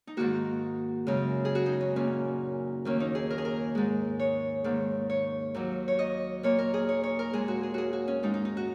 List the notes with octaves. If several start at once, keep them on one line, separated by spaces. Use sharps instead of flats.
D#4
G#2 D#3 A#3 F#4
F#2 C#3 G#3
G#4
F#4
D#4
C#4
A#2 A#3 C#4
D#2 D#3 A#3 C#4
D#4
G#4
A#4
G#4
A#4
G#2 G#3
C#5
G#2 D#3 A#3
C#5
D#2 D#3 F#3
C#5
D#5
A#2 A#3 C#5
A#4
G#4
C#5
C#5
A#4
A#2 G#3 G#4
F#4
G#4
F#4 G#4
F#4
C#4
G#2 G#3 D#4
D#4
D#4
F#4